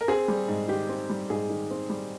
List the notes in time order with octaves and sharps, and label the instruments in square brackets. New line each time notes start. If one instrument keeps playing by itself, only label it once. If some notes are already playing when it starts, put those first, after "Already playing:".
[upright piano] A#4
C4 G#4
G3
G#2
D#3 G4
C4
G3
G#2 G#4
D#3
C4
G3